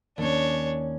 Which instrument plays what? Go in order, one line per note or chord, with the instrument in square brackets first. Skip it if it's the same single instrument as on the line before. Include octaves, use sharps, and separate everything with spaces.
[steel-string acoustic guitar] D#2 C#4 [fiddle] D4 C#5